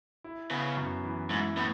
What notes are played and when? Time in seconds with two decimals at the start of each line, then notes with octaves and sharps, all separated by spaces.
0.24 E4
0.50 C#3 B3
0.77 F#2
1.04 E3
1.30 G#2 E4
1.57 A2 B3